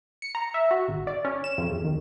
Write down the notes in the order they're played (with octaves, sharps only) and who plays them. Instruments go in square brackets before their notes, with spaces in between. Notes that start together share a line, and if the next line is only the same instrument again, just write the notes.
[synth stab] C#7
A#5
E5
F#4
G#1
D5
C#4
E7
F2
E2
D#2